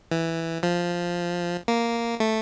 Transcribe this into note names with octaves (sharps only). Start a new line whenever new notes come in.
E3
F3
A#3
A3